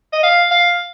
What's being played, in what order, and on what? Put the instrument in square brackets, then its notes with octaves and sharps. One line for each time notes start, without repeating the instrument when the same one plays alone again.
[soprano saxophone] D#5
F5
F5